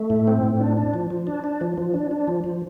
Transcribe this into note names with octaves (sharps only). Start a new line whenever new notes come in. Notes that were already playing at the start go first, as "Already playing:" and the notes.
Already playing: A3
A2
C4
A2
D4
D4
F3
F3
D4
D4
F3
F3
D4
D4
F3
F3